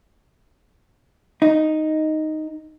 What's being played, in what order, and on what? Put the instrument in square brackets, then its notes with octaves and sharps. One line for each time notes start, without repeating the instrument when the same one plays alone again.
[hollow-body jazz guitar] D#4